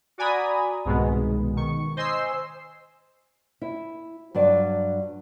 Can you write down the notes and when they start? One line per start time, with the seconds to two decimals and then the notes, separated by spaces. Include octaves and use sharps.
0.18 F#4 D5 G#5 A#5 B5 D#6
0.85 C2 G#2 B2 D#3 G#3 B3
1.57 D#3 C#6
1.97 C5 D#5 G#5 C6 E6 C7
3.62 E4
4.35 G2 F#3 D5